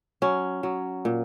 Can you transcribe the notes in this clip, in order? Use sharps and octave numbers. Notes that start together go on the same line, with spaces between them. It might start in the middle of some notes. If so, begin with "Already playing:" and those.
F#3 C#4
F#3
A#2